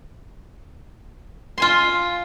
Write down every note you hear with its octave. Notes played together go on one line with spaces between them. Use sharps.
F4 G#5 C6